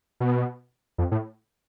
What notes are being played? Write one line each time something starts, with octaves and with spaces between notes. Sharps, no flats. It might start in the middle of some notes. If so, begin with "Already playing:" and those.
B2
F2
A2